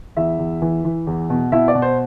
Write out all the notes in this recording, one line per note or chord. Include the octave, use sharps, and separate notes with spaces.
E2 E4 E5
E2
E3
E3
E2
B2
B2 E4 E5
D5
B2
C5